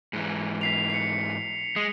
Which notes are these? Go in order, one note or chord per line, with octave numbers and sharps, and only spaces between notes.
G#2 E3
B6 C7 F7
C7 C#7
G#3 D#6